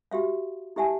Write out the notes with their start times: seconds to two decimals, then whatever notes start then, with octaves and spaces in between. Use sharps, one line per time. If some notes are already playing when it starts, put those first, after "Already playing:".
0.11 F#4 G4 E5 F5
0.76 E4 G4 E5 F#5 G#5 A5